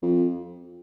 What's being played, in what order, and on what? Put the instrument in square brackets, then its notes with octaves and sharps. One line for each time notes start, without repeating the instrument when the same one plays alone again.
[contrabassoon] F2